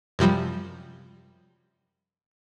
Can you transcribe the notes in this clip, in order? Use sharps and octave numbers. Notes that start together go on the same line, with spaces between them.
F#2 C3 F3 G3